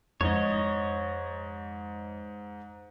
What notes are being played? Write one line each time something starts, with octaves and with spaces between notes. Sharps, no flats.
F2 G#2 C#5 D#5